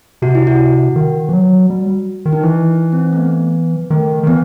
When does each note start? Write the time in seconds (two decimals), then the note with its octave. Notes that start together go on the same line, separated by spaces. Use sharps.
0.22 C3 F#4
0.35 E4
0.47 F#4
0.96 D#3
1.29 E3
1.33 F#3
1.70 G3
2.26 D#3
2.33 D#4
2.43 E3 E4
2.69 D#4
2.93 C4
3.13 A3
3.17 B3
3.90 D#3 A3
4.23 D#3
4.27 E3 B3